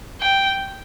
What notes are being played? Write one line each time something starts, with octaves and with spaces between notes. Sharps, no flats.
G5